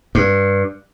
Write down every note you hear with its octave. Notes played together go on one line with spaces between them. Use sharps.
G2